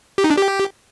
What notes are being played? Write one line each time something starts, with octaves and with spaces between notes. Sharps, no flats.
G4
D#4
D4
G4